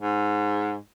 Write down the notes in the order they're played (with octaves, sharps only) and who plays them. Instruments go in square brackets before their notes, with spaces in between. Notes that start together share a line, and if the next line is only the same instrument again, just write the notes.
[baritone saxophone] G#2